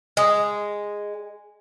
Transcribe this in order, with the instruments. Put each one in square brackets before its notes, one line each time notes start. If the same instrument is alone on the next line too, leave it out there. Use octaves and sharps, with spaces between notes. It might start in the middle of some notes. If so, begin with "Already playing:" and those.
[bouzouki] G#3 [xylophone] D#5 D#6